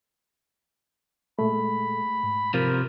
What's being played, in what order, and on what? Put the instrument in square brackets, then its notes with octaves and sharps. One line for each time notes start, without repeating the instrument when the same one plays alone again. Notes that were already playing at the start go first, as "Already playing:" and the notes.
[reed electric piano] A#2 G#3 A3 [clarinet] B5
[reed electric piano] G#2
[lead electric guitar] C3 F3 [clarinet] A#4